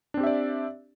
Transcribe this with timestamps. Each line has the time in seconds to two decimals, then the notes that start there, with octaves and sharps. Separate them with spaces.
0.14 D4
0.17 C4
0.20 G4
0.24 E5
0.27 D5